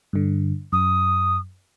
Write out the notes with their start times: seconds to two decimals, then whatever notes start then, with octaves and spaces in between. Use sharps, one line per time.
0.13 G2 D3
0.72 F#2 D#6